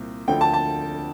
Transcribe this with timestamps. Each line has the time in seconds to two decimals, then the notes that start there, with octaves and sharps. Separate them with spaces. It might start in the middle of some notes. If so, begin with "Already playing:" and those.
Already playing: C2 A#2 C4
0.28 D2 D3 F3 G5
0.41 A5
0.53 A5